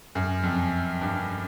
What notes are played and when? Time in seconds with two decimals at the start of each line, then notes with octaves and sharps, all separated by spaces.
0.15 F#2
0.43 F2
1.01 G2